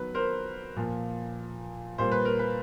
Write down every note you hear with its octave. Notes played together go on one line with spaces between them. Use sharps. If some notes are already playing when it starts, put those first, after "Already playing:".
Already playing: D#3 F#3 B3 B4
A#4 C5
A#2 F3 A#3
A#2 G3 A#3 C5
B4
A#4
B4